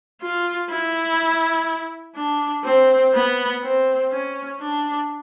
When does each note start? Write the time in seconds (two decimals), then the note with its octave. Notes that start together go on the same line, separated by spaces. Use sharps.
0.21 F4
0.70 E4
2.16 D4
2.64 C4
3.14 B3
3.63 C4
4.11 C#4
4.60 D4